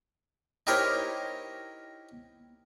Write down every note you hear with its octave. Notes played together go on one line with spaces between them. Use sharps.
D#4 E4 G4 A#4 C5 C#5